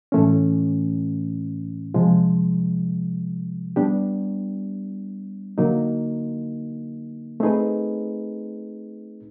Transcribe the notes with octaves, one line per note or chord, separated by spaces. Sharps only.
A2 E3 A3 C#4
C3 F3 G#3
G3 B3 D4 G4
D3 F#3 A#3 D#4
A3 C4 D#4 G#4 B4